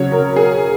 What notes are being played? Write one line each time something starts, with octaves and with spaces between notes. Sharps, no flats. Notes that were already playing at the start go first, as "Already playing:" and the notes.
Already playing: C#3 F#3 C#5
A#4
G#4